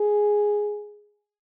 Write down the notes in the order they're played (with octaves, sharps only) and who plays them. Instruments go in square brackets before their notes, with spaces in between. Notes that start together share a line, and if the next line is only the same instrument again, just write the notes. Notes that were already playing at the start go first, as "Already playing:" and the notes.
Already playing: [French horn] G#4